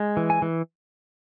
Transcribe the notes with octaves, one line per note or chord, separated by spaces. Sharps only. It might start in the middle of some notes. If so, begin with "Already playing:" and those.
Already playing: G#3
E3
G#5
E3